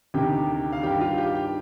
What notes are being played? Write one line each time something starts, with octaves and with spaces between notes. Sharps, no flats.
D2 C3 D#3 G4 G5
F5
G2 D#3 G4 G5
F4 F5
G4 G5
G4 G5